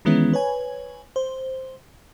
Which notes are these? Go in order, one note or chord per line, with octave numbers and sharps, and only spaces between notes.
D#3 E3 G#3 B3 C#4 E4
B4 C#5 G#5
C5